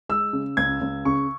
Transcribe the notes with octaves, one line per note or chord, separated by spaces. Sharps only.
G#3 E6
C#3
C#2 G#6
C#2
C#3 C#6